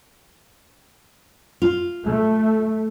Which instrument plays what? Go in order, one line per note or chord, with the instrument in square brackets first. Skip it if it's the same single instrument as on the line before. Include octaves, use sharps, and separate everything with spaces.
[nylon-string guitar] F4
[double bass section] A3